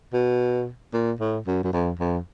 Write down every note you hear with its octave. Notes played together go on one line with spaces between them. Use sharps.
B2
A#2
A2
F#2
F#2
F2
F2